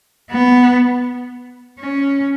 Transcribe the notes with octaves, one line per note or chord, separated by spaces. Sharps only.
B3
C#4